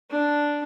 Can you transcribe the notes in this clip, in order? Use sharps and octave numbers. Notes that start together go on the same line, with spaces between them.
D4